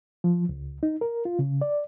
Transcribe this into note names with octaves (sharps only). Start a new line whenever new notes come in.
F3
C#2
D#4
A#4
F4
C#3
D5